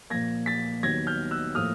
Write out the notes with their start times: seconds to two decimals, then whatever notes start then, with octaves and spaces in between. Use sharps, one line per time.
0.10 A#2 F3 A#3 G#6 A#6
0.46 A6 B6
0.83 D#2 D#3 F#3 B3 G#6 A#6
1.07 F6 G6
1.31 E6 F#6
1.55 A2 F3 A#3 D#6 F6